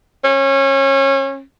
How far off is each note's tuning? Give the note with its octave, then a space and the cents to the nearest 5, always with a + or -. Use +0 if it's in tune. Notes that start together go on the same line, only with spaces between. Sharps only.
C#4 -25